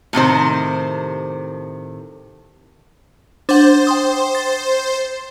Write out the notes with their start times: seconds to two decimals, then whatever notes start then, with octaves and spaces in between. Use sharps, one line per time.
0.13 A2 C3 D#3 C5
3.49 D4 C5 F#5
3.87 G5 C6 D#6
4.35 A6